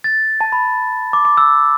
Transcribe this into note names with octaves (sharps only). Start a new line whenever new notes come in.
A6
A5
B5
D6
D6
E6